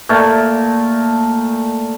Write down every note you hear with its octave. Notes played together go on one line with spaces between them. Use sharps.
A#2 A3